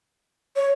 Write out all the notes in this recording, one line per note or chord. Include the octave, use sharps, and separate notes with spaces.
C#5